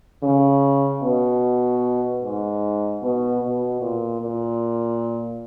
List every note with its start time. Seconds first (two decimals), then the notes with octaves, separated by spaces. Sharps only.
0.23 C#3
1.03 B2
2.22 G#2
3.02 B2
3.41 B2
3.80 A#2
4.21 A#2